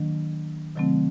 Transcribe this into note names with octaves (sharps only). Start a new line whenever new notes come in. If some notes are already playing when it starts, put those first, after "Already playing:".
Already playing: D#3 F#3 A#3 D4
C3 D#3 F#3 A3 C4